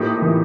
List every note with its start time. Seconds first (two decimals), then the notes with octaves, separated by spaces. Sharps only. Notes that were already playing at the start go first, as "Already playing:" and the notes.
Already playing: A2 F3 A#3 D#4 G4
0.22 E3